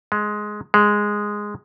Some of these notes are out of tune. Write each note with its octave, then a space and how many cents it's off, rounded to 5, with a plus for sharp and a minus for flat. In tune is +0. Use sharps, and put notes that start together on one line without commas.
G#3 +10
G#3 -5